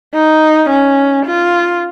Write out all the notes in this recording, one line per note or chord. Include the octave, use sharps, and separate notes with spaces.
D#4
C#4
F4